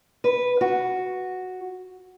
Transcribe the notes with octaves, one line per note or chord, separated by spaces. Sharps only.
B4
F#4